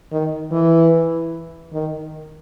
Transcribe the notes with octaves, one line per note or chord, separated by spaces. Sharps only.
D#3
E3
D#3